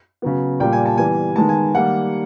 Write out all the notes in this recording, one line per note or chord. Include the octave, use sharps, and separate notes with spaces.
C#3 F#3 B3
A#2 G3 A#3 G5
G#5
A5
E3 G3 B3 G#5
D#3 G#3 B3 A5
G#5
D#3 G3 A#3 F#5